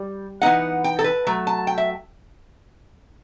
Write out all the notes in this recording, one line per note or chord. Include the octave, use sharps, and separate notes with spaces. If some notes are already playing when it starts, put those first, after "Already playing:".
Already playing: G3
E3 B3 D#4 F#5
G5
A4
B4
F#3 A3
A5
G5
E5